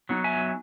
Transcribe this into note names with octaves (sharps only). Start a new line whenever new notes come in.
F#3 B3 D#4
E5 G#5